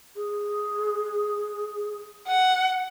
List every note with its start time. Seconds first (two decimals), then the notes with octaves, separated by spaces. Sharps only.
0.16 G#4
2.28 F#5